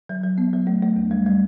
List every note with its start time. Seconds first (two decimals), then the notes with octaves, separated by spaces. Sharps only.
0.09 F#3
0.24 F#3
0.38 B3
0.53 F#3
0.67 A3
0.83 A3
0.96 E2
1.11 G3
1.26 G3